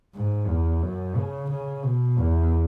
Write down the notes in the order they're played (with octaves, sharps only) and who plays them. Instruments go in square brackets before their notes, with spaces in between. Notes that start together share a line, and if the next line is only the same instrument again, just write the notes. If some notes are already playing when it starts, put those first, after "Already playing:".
[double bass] G#2
E2
F#2
C#3
C#3
B2
E2